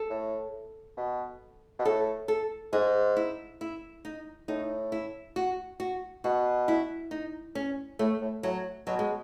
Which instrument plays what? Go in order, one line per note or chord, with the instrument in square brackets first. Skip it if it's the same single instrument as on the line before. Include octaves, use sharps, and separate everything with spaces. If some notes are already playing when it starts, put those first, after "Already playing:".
Already playing: [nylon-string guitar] A4
[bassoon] A2
B2
B2
[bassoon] A2 [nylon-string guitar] A4
[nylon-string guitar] A4
[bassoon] G#2 [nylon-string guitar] G#4
[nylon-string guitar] E4
E4
D#4
[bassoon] A2 [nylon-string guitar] D#4
[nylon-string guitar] E4
F#4
F#4
[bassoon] B2 [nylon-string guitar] F#4
[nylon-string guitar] E4
D#4
C#4
[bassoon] A2 [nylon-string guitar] A3
[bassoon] A2
[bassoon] A2 [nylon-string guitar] F#3
[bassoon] B2 [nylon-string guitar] F#3
[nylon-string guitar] G#3